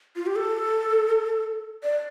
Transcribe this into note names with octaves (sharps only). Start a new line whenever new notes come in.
F4
G4
A4
D5